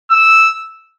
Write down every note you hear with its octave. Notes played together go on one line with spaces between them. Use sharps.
E6